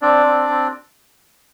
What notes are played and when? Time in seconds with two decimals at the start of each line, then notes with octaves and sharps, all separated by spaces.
0.02 C4 D4 D5
0.26 C4
0.49 C4